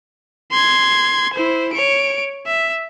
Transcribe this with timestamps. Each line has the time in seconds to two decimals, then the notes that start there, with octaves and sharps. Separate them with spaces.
0.52 C6 G#6
1.33 E4 C5
1.73 C#5 D7
2.46 E5